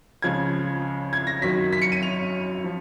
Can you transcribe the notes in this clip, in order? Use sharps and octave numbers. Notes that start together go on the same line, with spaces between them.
C#2 C#3 F3 G#6
G#6
A#6
F#2 D#3 F#3 B6
B6
C#7
D#7
F7
F3